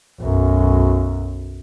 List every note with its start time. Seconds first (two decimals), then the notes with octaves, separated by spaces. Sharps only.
0.20 B1 F#2